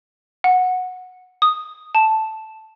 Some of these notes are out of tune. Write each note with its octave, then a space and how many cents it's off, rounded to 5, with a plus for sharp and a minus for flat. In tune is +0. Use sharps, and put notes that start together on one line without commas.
F#5 -10
D#6 -5
A5 -5